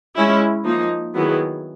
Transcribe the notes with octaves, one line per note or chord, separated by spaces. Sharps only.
G#3 C#4 E4
F3 A#3 D#4
D#3 F#3 B3 E4 G#4